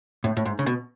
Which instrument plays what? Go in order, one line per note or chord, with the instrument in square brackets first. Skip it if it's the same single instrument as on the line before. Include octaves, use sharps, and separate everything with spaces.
[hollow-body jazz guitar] A2
A2
G#2
C#3
B2